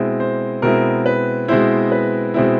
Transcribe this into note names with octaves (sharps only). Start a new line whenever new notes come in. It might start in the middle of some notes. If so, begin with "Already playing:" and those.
Already playing: B2 G#3 C4 E4
C5
B2 G#3 C4 E4 A#4
B4
B2 G#3 C4 E4 C5
B4
B2 G#3 C4 E4